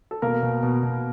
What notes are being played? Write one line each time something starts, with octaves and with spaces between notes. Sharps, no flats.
A4
B2 A#3 A#4
B2
B2
B2